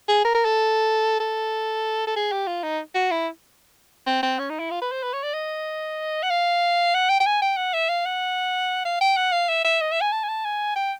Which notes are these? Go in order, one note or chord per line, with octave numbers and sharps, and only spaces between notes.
G#4
A#4
A#4
A4
A4
A4
G#4
G4
F4
D#4
F#4
E4
C4
C4
C#4
D#4
E4
F4
B4
C5
B4
C#5
D5
D#5
F#5
F5
F#5
G5
G5
G#5
G5
F#5
E5
F5
F#5
F5
G5
F#5
F5
E5
E5
D#5
E5
G#5
A5
G#5
A5
G#5
G5